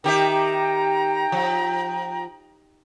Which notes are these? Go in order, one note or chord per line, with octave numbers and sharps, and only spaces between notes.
D#3 G4 E5 G5 A#5
F3